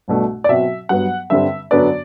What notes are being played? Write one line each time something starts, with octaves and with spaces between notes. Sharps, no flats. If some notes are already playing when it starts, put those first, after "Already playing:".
C2 B2 A3 D4
D5
B2 F#3 C4 E5
G2 F#3 B3 F#5
G2 D3 G3 C4 E5
F#2 D3 F#3 B3 D4 D5